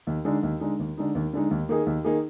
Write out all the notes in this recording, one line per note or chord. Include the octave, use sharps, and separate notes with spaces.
D#2
D3 G#3 D#4
D#2
D3 G#3 D#4
D#2
D3 G#3 D#4
D#2
D3 G#3 D#4
D#2
D#3 A#3 D#4 G#4
D#2
D#3 A#3 D#4 G#4